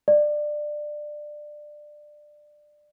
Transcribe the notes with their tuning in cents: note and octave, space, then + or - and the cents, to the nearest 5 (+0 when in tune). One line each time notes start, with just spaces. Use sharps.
D5 +20